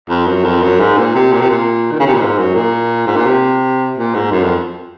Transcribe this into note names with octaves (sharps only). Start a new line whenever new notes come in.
F2
F#2
F2
F#2
G#2
A#2
C3
A#2
C3
A#2
D#3
C#3
C3
A#2
G#2
F#2
A#2
G#2
A#2
C3
A#2
G#2
F#2
F2